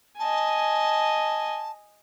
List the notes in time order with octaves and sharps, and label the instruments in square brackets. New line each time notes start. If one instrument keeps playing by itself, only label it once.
[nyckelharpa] D#5 G#5 [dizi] A5